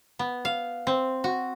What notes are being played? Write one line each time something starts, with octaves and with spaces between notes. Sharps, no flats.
B3
F5
C4
F#4